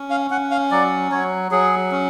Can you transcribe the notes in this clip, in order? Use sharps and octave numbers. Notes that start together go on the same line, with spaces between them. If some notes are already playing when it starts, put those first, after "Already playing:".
Already playing: C#4
F5
C#4 F#5
F5
F#3 D5
F#3 C#5
F#3 G#4
C#4